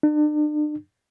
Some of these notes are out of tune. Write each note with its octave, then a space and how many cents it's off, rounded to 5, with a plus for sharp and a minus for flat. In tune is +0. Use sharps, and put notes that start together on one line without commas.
D4 +40